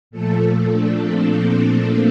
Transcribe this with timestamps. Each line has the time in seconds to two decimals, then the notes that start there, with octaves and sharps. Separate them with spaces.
0.11 A#2 F3 A3 A4
0.40 A4
0.71 D4
1.01 C4
1.30 A#3
1.61 C4